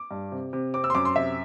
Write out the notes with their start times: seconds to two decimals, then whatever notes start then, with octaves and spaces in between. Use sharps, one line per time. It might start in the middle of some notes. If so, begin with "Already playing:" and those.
Already playing: D6
0.11 G2
0.32 C3
0.53 C3
0.74 C4 D6
0.84 E6
0.90 C6
0.95 F#2 D6
1.05 C6
1.16 C3 E5